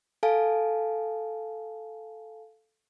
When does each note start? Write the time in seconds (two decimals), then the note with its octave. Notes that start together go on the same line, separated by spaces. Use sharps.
0.23 A4 F5 G#5 A5